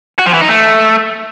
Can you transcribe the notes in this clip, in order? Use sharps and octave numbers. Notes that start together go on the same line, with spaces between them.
F#4
F3
E3
D#4
A3